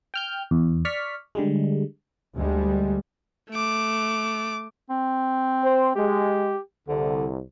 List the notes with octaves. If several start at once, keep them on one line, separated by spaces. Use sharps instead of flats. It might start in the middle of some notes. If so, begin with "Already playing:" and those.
G5 F6 G6
E2
D5 C#6 F6 B6
D3 G3 G#3
D2 G3 G#3
A3 D6
C4
C5
G#3 G4
C2 D3